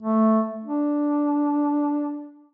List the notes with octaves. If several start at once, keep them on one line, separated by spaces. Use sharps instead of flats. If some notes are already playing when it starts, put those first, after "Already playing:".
A3
D4